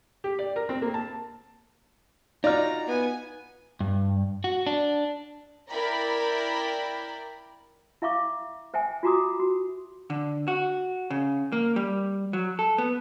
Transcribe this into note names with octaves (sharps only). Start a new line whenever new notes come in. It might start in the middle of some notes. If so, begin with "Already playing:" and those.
G4
D5
A#4
C4
A#3
A5
D#4 F4 F#4 D5 A#5 F6
B3 G#5
G2
F#4
D4
E4 A#4 D5 G5 A#5 B5
E4 E5 F5 C#6 D6
C5 E5 G5 G#5
F4 F#4 A#5 D6 D#6
F#4
D3
F#4
C#3
A#3
G3
F#3
A4
B3